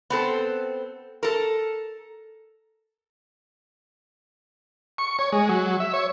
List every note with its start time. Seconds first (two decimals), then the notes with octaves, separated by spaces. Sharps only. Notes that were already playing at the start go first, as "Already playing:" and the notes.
0.10 B3 C4 A4
1.23 A4 A#4
4.98 C#6
5.19 C#5
5.32 G#3
5.49 F#3
5.80 E5
5.94 C#5